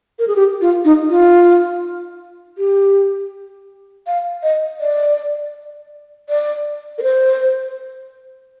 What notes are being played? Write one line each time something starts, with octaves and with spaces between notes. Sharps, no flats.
A#4
G#4
G4
F4
D#4
F4
G4
F5
D#5
D5
D5
A#4
C5